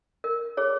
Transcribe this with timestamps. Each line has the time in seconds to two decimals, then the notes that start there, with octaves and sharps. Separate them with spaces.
0.24 A#4
0.57 G#4 C#5